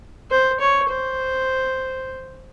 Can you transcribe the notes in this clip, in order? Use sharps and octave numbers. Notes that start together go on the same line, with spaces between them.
C5
C#5
C5